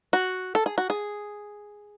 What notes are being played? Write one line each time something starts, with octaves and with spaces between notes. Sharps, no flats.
F#4
A4
G#4
F#4
G#4